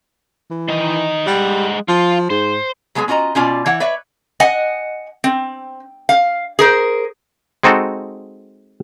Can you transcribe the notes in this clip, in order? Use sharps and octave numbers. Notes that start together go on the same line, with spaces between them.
E3
D#3 D#4
G3 G#3 F#5
F3 F4
G#2 C5
F#3 G#3 B3 F4 G#4
C#4 F4 F#4 D#5 A#5
B2 C#4 F4 D5
E3 C#5 F#5
B4 C#5 D5 E5
D#5 F#5 G#5
C4
F5
G#4 A#4 C5
G#3 C4 D#4 F#4 A4